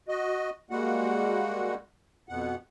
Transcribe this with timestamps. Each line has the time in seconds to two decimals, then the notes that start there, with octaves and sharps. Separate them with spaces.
0.08 F#4 D#5
0.70 G3 G#3 A#3 F#4 F#5
2.29 F2 B2 F#5